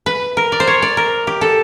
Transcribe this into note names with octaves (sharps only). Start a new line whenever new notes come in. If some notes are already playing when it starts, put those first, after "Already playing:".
B4
A#4
D5
C5
C#5
D5
A#4
G4
A4